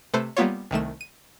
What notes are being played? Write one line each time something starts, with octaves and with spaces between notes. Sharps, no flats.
C3 A3 A4 B4 C5
G3 A#3 B3 F4 C#5
C2 D#3 A3 E7
D#7